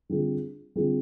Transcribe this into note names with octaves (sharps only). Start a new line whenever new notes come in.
D3 G3 C4 F4 G#4
D3 G3 C4 F4 G#4